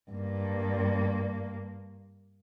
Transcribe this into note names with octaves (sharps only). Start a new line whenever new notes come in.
G2 A#3